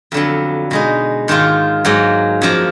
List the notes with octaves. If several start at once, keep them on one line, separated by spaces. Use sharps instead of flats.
F2 D3 F#3 B3
B2 G#3 D#4
G#2 D#3 A#3 F4
G#2 F#3 A#3
F#2 F3 A#3